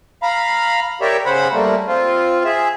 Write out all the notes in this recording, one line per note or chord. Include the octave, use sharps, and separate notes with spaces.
F5 A#5 B5
G4 A#4 C#5 D5 E5
C#3 C5 F#5 B5
G3 A3 A#3
C4 F4
G#4 E5